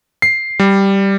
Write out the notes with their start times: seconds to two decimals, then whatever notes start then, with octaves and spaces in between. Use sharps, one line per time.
0.22 C7
0.59 G3